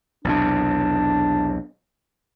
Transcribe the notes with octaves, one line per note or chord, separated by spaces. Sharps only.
B1 E2 C3 D4